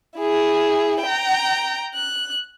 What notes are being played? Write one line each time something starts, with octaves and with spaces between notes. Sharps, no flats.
E4 G#4
G5 A#5
F#6